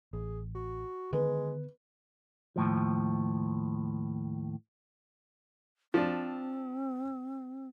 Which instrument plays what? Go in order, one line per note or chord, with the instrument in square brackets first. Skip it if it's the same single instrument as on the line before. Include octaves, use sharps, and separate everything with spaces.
[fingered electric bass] A1 [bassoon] G#4
[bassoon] F#4
[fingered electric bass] D3 D#3 B3 [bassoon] G#3 [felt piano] B4
[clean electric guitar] D#2 A2 F3
[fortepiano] F3 D4 [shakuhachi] C4